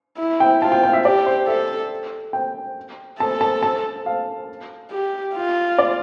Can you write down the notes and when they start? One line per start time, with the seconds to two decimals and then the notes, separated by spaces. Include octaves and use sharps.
0.18 E4
0.40 G5
0.62 F4 A5
0.72 G5
0.83 G5
0.93 E5
1.05 G4 D5
1.26 C5
1.47 A4 E5
2.33 G5
3.20 A4 A5
3.41 A5
3.63 A5
4.06 F5
4.92 G4
5.35 F4
5.78 D5